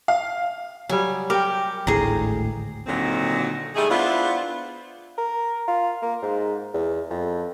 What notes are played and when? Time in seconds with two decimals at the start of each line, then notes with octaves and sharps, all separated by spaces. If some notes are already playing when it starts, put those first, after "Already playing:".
0.08 F5
0.89 F#3 G3 G#5
1.30 G4 A#4 G5 D6
1.87 G#1 D2 A2 G#4 A#5
2.87 A#2 D3 D#3 F#3 C4
3.75 G3 A3 D#4 G#4
3.90 B3 D4 E4 F4 C5
5.17 A#4
5.68 F4
6.02 A#3
6.22 G#2
6.74 E2
7.10 F2